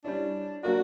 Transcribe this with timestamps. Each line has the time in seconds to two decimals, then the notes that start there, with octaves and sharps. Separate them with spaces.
0.04 G3 C#4 D4 E4
0.63 F#3 A#3 D4 F#4 A#4 D5